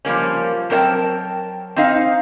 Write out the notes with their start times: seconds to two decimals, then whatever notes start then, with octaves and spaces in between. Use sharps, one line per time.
0.05 F3 G3 A#3 C#4
0.70 F#3 C4 A#4 C5 G5 A5
1.76 C4 D#4 F5